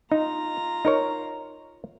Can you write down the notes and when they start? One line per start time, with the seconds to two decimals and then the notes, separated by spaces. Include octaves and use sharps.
0.12 D#4 F4 A#5
0.85 D#4 A#4 C#5